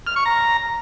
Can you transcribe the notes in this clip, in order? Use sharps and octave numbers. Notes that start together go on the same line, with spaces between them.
F6
C#6
A#5